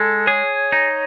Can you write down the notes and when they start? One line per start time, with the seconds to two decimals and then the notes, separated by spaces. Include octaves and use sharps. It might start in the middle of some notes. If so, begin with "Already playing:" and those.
Already playing: G#3 A4
0.27 G#4 C#5
0.72 D#4